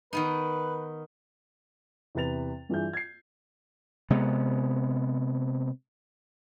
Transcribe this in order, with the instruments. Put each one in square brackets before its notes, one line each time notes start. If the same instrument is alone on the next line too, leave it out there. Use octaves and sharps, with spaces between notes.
[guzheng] D#3 B3 D#4 [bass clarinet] B4
[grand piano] E2 C3 B4 A6 F7
G2 E3 F4 G#4 E5 G6
G#6 C7
[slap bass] C3 G#3 B3